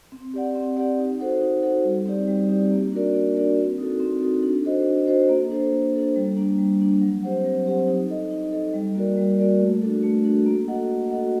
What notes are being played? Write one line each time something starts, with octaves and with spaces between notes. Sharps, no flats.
C4
G4 D5 F#5
C4
G4 D5 F#5
D#4
F#4 A4 C5 F#5
D#4
F#4 A4 C5 F#5
G3
C4 D#4 G4 D5
G3
C4 D#4 G4 D5
A#3
D4 F#4 A#4 D5
A#3
D4 F#4 A#4 D5
C4
D#4 F#4 A4
C4
D#4 F#4 A4
D4
F#4 A4 C5 D#5
D4
F#4 A4 C5 D#5
A#3
D4 A4 C5
A#3
D4 A4 C5
G3
A#3 D4
G3
A#3 D4
F#3
C4 G4 C5 F#5
F#3
C4 G4 C5 F#5
D#4
A4 D#5
D#4
A4 D#5
G3
A#3 F#4 A#4 D5
G3
A#3 F#4 A#4 D5
A3
D4 F#4 A4
A3
D4 F#4 A4
A#3
F#4 A4 D#5 F#5
A#3
F#4 A4 D#5 F#5